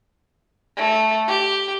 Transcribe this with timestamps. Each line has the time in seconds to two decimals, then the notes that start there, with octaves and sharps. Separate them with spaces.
0.77 A3
1.27 G4